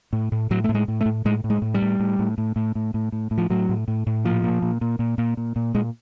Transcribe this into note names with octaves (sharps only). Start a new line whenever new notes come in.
A2
A2
A2 F#3
A2 A3
G#3
A2
A3
A2
A2 G#3
A2
G#3
A2
G3
A2
A2
A2
A2
A2
A2
A2
A2
A2
F3
A2 F#3
A2
A2
A2
A#2 F3
A#2
A#2
A#2
A#2
A#2
A#2
A#2
A#2 G#3